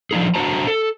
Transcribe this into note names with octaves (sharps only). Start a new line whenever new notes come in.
F3 D4 D#4 G#4
D4 F#4 C5 A5 A#5
A4